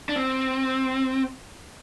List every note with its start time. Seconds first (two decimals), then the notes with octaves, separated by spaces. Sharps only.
0.09 D4
0.16 C4